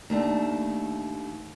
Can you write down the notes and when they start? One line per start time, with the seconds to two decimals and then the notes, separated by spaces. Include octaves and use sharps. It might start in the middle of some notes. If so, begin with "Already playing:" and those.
0.10 D#2 A3 D4